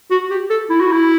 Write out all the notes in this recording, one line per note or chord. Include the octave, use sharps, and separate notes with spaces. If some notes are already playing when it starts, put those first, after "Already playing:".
F#4
G4
A4
E4
F#4
E4